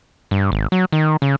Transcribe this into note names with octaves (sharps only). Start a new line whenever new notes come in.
G2
G#1
F#3
D#3
C#3